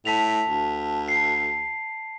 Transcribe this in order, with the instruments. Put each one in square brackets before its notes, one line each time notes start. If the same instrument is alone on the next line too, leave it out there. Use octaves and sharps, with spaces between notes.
[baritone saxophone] A2 [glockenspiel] A5 B6 F7
[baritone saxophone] D2
[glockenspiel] C7